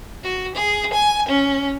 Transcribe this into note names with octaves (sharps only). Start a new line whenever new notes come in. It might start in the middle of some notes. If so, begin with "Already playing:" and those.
F#4
G#4
G#5
C#4